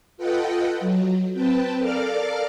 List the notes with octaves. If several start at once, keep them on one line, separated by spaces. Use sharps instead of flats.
F4 A4 B4 D#5 F#5 G5
F#3
C4 B4 G5 A5
A4 A#4 D5 F5 D6 F6